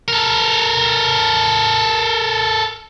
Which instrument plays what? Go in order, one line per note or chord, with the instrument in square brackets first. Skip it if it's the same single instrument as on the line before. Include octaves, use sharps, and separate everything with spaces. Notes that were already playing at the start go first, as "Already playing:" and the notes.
[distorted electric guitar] A4 A#4